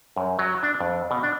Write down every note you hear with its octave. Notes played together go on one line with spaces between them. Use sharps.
F#2
F#3
D4
F2
B2
D4